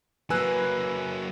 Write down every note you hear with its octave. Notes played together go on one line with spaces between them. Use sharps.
F#3 A#3 B4 G#5 E6 F#6